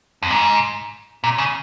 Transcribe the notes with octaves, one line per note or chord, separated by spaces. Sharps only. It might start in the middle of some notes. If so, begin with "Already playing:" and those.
F2
G#2
A#2
C#3